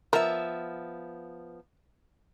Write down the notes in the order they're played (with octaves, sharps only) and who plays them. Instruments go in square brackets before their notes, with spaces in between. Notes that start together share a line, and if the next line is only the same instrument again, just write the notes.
[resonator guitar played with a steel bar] F3 B3 E5 [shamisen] A#4